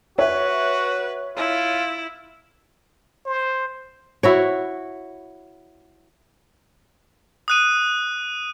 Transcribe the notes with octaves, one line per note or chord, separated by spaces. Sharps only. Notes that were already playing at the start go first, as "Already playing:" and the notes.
F#4 B4 C#5 E5
E4 F4
C5
E4 F#4 C#5
D#6 F#6 D#7